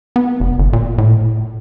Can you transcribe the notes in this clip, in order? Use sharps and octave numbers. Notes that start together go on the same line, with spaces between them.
B3
F1
G1
A#2
A2